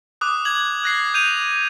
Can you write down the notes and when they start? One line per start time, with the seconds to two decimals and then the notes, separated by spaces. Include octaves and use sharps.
0.21 D6 D#6 F#6
0.45 G#6 F#7
0.84 F#6 A#6 C7
1.14 G6 D#7 F7